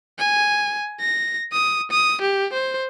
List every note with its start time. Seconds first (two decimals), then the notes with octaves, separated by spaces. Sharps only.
0.18 G#5
1.00 A#6
1.52 D#6
1.91 D#6
2.21 G4
2.53 C5